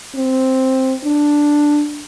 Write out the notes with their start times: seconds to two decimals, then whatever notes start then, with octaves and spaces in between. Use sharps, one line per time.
0.16 C4
1.04 D4